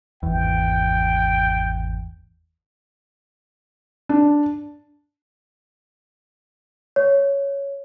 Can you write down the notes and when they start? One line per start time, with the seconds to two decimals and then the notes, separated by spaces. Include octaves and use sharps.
0.23 G#1 E2 G5
4.09 D4
6.96 C#5